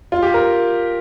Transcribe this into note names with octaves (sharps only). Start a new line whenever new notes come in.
F4
G4
A#4